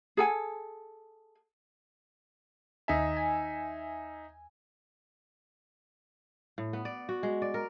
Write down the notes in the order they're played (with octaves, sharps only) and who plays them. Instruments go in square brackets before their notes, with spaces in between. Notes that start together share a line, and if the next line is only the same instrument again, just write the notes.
[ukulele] G#4 A4 G#5
[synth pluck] D#2 G#5 [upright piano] D#4 E5
[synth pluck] G#5
[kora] A2
B3
D5
F#4
G#3
D5
A#4